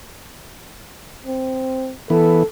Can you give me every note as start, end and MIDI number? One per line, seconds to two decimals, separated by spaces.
1.27 1.94 60
2.10 2.43 52
2.10 2.43 59
2.10 2.45 69